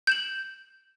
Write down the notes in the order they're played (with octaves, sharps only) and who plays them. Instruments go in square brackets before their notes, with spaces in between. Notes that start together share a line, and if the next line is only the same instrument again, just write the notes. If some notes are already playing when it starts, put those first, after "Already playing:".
[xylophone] G6 E7 F#7